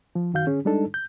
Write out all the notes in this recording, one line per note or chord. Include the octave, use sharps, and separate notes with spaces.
F3
F#2 D#3 F#4 F5 G6
D3 C#4 G#4
G3 G#3 D4 D#4 A4
G6